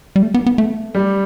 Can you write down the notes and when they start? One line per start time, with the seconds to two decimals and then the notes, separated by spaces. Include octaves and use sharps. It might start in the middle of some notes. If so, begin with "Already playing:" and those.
0.16 G3
0.22 A3
0.34 B3
0.46 B3
0.58 A3
0.95 G3